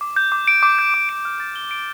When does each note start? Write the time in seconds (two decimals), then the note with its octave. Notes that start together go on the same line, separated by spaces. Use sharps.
0.01 D6
0.16 G6
0.32 D6
0.48 D7
0.63 D6
0.79 G6
0.94 D6
1.09 D7
1.25 F6
1.40 A6
1.56 G7
1.71 D7